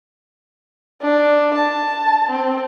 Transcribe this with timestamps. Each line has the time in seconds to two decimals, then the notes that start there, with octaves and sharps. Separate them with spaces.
1.01 D4
1.54 A5
2.30 C4